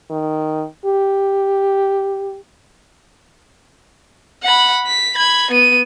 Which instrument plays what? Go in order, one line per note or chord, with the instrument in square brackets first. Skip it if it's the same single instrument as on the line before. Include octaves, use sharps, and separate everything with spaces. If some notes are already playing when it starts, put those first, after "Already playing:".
[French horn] D#3
G4
[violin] F#5 B5
B6
B5 G#6
B3 D#7